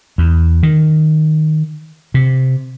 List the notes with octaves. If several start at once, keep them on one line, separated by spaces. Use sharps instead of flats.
E2
D#3
C3